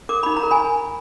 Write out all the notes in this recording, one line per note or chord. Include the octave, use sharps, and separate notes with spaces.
A#4 D6
D#4 B5
A#5
A#4
G#5 B5